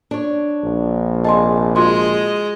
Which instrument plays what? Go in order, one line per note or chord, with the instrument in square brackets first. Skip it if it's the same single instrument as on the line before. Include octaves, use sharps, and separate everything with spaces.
[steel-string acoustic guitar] D4 C#5
[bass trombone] A#1
[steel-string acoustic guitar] C3 G#4 A5 [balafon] D#5 C6
[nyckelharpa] G#3 D#5 [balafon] F4 F#4 C6